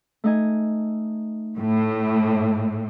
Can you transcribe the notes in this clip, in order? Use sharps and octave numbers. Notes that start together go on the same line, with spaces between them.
A3 D#4 G#5
A2